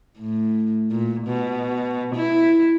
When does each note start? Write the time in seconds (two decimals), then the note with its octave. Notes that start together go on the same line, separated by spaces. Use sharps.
0.19 A2
0.91 A#2
1.27 B2
2.15 E4